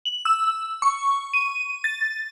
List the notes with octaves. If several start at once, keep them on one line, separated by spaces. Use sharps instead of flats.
F#7
E6
C#6
D#7
A6